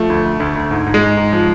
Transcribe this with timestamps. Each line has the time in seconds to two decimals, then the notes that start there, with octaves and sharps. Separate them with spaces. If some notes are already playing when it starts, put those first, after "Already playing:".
Already playing: F3 A3
0.10 D2
0.25 D2
0.40 D2
0.56 D2
0.71 G#2
0.86 G#2
0.94 G#3
1.02 G#2
1.17 G#2
1.32 F3